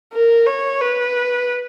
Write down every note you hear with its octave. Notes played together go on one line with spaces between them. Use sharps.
A#4
C#5
B4